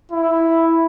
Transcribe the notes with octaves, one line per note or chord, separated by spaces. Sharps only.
E4